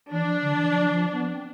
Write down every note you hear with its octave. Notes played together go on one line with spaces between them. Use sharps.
E3 D4
F3
D3
E3
F3
F3
B3
C4